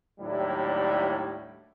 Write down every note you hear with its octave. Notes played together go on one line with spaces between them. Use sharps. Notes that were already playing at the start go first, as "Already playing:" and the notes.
D#2 A2 F#3 G3 D4 E4